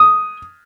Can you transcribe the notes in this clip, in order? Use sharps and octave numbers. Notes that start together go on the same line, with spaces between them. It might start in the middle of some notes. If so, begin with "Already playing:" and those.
Already playing: D#6